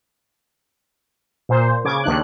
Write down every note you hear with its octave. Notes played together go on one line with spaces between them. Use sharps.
A#2 C5
C#3 D6 G#6
D#2 D4 F#6